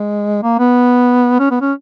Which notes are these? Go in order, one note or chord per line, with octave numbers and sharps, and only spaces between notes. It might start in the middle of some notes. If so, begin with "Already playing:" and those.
Already playing: G#3
A#3
B3
C#4
B3
C#4